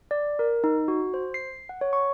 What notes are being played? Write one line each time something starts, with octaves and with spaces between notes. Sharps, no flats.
D5
A#4
D#4
F#4
C5
C7
F#5
C#5
C#6